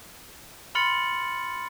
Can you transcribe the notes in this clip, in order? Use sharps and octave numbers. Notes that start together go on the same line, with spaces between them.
B5 C6 F6 A6 C#7 F#7